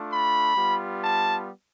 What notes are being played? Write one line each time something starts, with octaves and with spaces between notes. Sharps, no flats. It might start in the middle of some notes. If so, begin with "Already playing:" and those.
Already playing: A3 D4 F4
B5
G3 B3 F4
A5